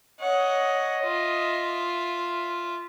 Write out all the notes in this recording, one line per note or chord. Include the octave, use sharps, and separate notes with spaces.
C#5 D#5 F#5
F4 E5